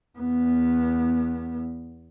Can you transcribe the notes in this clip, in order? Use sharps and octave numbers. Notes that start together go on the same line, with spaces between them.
E2 B3